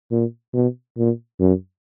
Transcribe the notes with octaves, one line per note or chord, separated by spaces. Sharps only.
A#2
B2
A#2
F#2